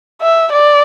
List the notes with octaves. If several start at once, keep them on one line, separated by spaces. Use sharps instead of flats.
E5
D5